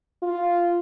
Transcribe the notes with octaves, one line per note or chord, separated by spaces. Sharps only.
F4